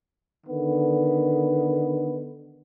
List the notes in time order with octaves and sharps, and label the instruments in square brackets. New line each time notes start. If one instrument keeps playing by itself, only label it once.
[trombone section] D3 D#3 B3